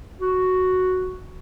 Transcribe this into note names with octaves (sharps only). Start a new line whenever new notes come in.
F#4